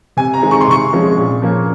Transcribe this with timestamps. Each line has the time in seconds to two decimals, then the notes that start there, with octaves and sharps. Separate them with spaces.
0.17 C3 G#5
0.34 A#5
0.42 D#3 G#3 C4
0.51 C#6
0.61 C6
0.68 C3 C#6
0.93 F3 G#3 C#4
1.17 A#2
1.42 F3 A#3 C#4